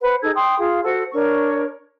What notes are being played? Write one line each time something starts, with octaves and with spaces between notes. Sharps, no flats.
B4 C5 F#5
D#4 G#4 A4 G#6
G5 C6 D#6
F4 G#4 F5
F#4 A4 C5 F#5
D4 A#4 C#5 C#6